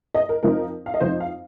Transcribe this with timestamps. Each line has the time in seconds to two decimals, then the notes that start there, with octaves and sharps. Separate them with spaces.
0.14 D#5
0.29 A#4
0.43 F2 F3 C4 D#4 A#4
0.86 F5
0.94 D#5
1.00 F2 F3 C4 D#4 C5
1.20 F5